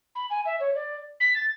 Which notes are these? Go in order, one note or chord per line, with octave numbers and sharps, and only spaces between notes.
B5
G#5
E5
C#5
D5
B6
A6